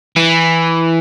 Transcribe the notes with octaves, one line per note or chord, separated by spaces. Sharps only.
E3